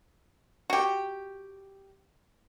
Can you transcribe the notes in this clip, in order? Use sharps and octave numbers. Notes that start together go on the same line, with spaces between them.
F#4 G4